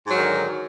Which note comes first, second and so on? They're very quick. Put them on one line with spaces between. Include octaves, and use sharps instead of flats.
G#2 F#3 D#3 D3